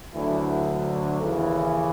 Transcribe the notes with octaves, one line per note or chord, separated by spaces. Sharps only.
D2 D3 E3 F#3 E4
D#2 C#3 E3